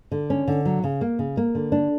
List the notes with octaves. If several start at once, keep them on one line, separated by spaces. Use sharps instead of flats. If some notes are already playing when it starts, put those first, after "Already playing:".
D3
C#4
D3
F#3
C#3
A#3
C#3
A#3
D3
D4